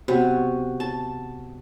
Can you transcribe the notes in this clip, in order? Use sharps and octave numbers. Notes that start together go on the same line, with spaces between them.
C3 B3 F#4
A5